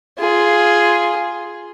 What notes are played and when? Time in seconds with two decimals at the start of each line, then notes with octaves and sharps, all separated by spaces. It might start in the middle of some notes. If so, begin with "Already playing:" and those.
0.19 F4 G#4